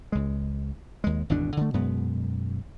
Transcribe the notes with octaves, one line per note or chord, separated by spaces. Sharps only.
C#2 G#3
D#2 G#3
G#1 E2 B2 D4
D3 A3
F#2 B2 G#3 B3